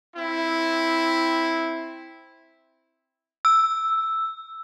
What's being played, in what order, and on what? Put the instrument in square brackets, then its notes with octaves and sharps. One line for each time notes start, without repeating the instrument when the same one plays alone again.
[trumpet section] C4 E4
[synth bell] E6